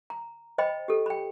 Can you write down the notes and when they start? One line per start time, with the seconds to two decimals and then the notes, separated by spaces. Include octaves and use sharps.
0.10 A#5
0.58 C5 D#5 G5 B5
0.88 G4 A4
1.06 G5 B5